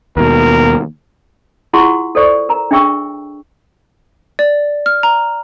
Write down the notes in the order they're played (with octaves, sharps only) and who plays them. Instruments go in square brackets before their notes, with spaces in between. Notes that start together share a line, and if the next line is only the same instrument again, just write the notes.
[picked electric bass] D#2 B2 [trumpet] A#4
[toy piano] E4 F4 G#4 F#5 C6 C#6
A4 C5 D5 C#6
A#4 A#5
D4 G#4 E5 G5 C#6 E6
[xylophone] D5
F6
A#5